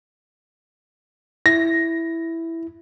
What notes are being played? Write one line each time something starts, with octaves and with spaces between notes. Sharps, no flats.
E4 A#6